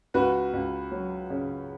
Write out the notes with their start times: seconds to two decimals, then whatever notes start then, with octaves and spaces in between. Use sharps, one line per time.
0.14 C#2 F#4 B4
0.53 C#2
0.91 F#3
1.30 C#3